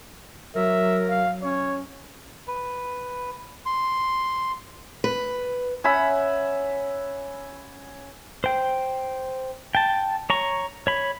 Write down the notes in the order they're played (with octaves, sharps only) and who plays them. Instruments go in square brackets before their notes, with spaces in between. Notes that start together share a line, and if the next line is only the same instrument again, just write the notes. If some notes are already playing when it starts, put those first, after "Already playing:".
[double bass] F#3 [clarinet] A#4 [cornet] E5
[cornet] F5
[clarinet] C#4 [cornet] C#5
[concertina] B4
C6
[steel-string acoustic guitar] B4
[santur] C#4 E5 F#5 B5
[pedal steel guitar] C5 G5
G5 A5
C#5 A#5 C#6
C#5 B5